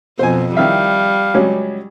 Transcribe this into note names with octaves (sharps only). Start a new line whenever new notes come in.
F2 B2 C5 G#5
D#3 G3 E4 E5 F5
C#2 F#3 C#4